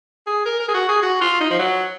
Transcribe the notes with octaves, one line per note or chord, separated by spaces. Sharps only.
G#4
A#4
A#4
G#4
F#4
G#4
F#4
F4
D#4
F3
F#3